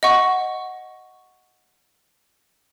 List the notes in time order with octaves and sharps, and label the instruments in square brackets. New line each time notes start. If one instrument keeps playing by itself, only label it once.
[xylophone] D#5 F#5 C#6